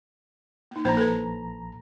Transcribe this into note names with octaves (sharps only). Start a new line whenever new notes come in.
A#3 D#4
A#1 A#3 D4 C5 A#5
A4 B4